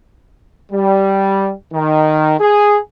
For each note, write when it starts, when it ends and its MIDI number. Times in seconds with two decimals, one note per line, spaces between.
0.72 1.52 55
1.73 2.34 51
2.40 2.77 68